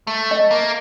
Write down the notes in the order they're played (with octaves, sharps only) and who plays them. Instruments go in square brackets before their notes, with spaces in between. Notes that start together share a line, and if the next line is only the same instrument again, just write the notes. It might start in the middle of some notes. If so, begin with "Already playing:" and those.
[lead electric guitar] A3
[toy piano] D#5
[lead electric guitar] A#3